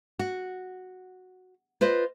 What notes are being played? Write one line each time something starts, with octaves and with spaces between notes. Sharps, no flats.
F#4
F4 B4 C5 D#5